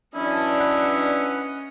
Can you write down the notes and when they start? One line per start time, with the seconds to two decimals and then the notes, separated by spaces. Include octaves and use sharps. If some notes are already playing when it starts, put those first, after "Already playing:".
0.15 E3 F#3 C#4 D4 E4 D#5
0.59 B4 F#5